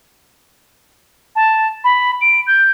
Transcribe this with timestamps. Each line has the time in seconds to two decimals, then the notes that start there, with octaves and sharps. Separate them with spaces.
1.35 A5
1.84 B5
2.21 D7
2.47 G6